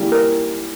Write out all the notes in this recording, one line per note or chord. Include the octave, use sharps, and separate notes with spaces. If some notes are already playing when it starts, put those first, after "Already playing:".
Already playing: E3 G3 A#3
A#4